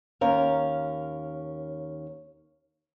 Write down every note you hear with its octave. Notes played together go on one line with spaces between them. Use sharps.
D#2 C#4 A#4 F5